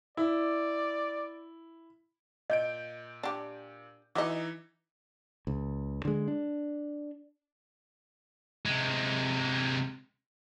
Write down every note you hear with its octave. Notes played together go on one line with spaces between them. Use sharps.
E4 D5
A#2 D#5 G6 D7
D4 G4
E3 D#4 F#4 D#5 E5 D6
C#2
D3 G#3
D4
C3 G#3